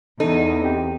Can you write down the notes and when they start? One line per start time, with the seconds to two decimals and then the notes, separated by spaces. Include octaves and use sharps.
0.20 E2 D#4 A4
0.62 C4 G4 G5